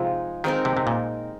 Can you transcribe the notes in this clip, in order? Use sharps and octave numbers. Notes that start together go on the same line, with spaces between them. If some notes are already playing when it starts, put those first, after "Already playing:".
Already playing: C3 F3 G#3 D#4
D#3 G#3 C4 D#4 A#4
C3
C3
A#2